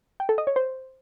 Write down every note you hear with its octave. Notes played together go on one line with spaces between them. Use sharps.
G5
A4
D#5
C#5
C5